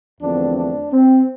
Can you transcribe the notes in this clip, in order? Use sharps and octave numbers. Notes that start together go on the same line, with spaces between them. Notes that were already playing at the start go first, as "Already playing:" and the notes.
E2 D3 F3 A3 C4 D4
D4
C4